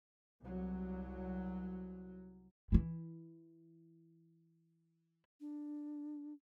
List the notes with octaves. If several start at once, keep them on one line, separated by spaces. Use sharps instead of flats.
C2 F#3
E3 E4
D4